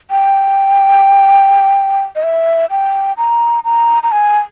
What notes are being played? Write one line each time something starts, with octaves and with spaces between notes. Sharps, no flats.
G5
D#5
E5
G5
A#5
A#5
A#5
G#5